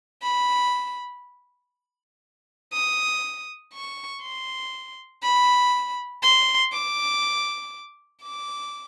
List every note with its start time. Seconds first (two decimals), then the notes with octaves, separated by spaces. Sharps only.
0.22 B5
2.73 D#6
3.73 C#6
4.22 C6
5.23 B5
6.22 C6
6.72 D6
8.22 D6